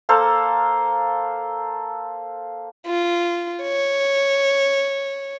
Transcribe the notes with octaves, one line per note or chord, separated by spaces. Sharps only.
A#3 A4 C5 F5
F4
C#5